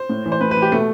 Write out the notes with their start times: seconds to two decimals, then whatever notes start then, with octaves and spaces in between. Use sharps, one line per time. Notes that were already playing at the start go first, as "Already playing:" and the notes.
Already playing: C5
0.09 A2
0.26 E3
0.32 C5
0.41 A2 B4
0.51 B4
0.57 E3
0.62 G4
0.72 B2 A3